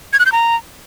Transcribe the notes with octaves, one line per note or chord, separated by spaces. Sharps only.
G#6
F#6
G6
A#5